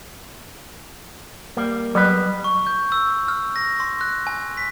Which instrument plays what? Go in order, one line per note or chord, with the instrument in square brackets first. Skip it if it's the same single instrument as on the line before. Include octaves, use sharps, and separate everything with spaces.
[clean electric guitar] G3 A#3
[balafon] F#3 [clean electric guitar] G3 B3 B4
[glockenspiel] C#6
G6
E6
F6
A#6
C6
F#6
G#5
B6